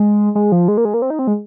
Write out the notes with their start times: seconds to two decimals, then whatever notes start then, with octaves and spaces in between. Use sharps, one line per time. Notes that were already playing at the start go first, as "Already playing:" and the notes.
Already playing: G#3
0.35 G#3
0.52 F3
0.68 G#3
0.77 A#3
0.85 G#3
0.94 A#3
1.02 C4
1.10 D#4
1.19 C4
1.27 G#3